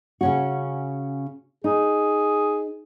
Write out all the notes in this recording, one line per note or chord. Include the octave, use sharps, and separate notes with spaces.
C#3 C#4 F#4
D#4 G#4